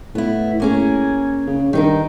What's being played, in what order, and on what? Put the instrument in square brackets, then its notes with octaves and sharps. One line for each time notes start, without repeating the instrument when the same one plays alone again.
[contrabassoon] A2 [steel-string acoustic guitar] B3 E4
[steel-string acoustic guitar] A#3 C#4 G#4
[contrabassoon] C#3
[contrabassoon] G2 [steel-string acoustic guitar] D#3 D#4 A#4